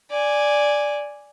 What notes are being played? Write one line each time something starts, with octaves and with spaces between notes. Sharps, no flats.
D5 G#5